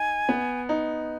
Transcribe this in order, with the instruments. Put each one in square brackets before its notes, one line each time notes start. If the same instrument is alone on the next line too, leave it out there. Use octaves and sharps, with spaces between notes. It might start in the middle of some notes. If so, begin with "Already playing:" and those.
Already playing: [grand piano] D#4 [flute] G#5
[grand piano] B3
D#4